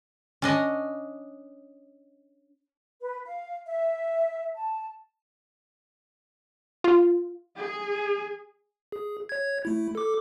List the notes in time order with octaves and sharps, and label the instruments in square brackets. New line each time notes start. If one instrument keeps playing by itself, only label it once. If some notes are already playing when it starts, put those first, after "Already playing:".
[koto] C#4 D4 D#5
[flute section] B4
F5
E5
A5
[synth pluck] F4
[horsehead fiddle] G#4
[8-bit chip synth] G#4
C#5 G#6
A3 E4
A4 D6